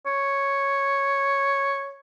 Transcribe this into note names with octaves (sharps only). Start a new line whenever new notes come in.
C#5